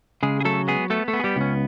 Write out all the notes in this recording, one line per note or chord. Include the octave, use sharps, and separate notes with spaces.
C#3 G#3 G#4
G#4
F#3 A3 A4
G#3 B3 G#4
A3 B3 A4
A3 A4
B3
G#4
G3 G4
C#2 C#4